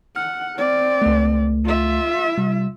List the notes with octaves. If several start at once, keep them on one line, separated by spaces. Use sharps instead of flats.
F#5 F6
C4 D5
C#2 A3
F4 E5
C3 G3